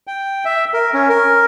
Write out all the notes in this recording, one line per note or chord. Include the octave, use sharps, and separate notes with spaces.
G5
E5
A#4
C#4
A#4